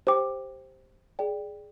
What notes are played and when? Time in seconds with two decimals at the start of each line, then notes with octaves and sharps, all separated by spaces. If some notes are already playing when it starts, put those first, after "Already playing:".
0.07 G4 C5 G5 D6
1.19 G#4 D5 G5